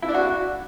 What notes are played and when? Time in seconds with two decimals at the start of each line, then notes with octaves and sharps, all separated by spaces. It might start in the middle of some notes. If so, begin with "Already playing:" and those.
0.02 E4
0.08 D4
0.14 F#4